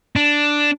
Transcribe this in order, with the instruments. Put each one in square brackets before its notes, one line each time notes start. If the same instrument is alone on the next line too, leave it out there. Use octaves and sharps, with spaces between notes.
[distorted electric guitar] D4